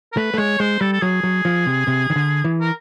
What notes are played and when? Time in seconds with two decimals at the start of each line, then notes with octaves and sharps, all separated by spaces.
0.13 A#4
0.17 A3 B4
0.34 A3
0.38 G#3 C#5
0.60 G#3 C5
0.81 G3 A4
0.92 A4
1.02 F#3 G#4
1.23 F#3
1.45 F3
1.66 C3
1.87 C3
2.10 D#3
2.16 D3
2.44 E3
2.61 A#4